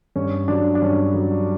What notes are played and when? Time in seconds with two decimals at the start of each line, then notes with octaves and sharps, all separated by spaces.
0.16 G2 C#4
0.48 F#3 D4
0.75 D4
0.82 G2 C#4
1.14 F#3